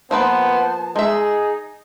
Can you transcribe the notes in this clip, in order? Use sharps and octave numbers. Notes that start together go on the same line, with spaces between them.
F3 A#3 B3 B4 C5 A5
G#3 D#4 G#4 E5